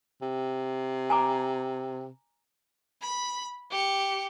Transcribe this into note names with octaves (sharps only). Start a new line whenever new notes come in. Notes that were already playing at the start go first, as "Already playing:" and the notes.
C3
G#5 A#5 D6
B5
G4 C#7